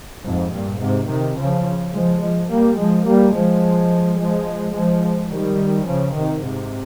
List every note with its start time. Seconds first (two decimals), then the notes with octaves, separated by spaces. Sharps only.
0.25 F2 G#2
0.53 G2 A#2
0.81 G#2 C3
1.09 C3 D#3
1.37 C#3 F3
1.93 F3 G#3
2.22 F3 G#3
2.50 G3 A#3
2.78 F3 G#3
3.06 G3 A#3
3.34 F3 G#3
4.18 F3 G#3
4.75 F3 G#3
5.31 D#3 G3
5.87 C#3 F3
6.15 C3 D#3
6.43 G#2 C3